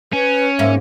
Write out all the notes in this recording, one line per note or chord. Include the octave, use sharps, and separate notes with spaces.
C#4 B4
G#2 A#3 E5